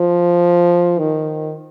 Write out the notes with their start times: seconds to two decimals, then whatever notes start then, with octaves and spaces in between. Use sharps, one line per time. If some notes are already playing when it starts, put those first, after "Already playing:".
Already playing: F3
0.99 D#3